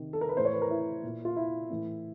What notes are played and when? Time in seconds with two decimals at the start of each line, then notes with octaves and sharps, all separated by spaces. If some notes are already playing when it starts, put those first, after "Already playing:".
Already playing: C3 D#3
0.13 A4
0.21 A#4
0.29 B4
0.37 A2 E3 C5
0.45 C#5
0.54 B4
0.62 A#4
0.70 E4
1.03 A#2
1.25 F4
1.36 E4
1.69 A2 E3